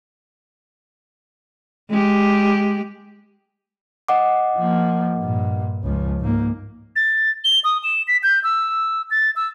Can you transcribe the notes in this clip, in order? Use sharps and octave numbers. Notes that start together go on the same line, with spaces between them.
G#3 G4
D#5 F#5 D6
F3 A#3
G2 A#2
C#2 F3
G#2 A#3
A6
G7
D#6
E7
B6
G6
E6
A6
E6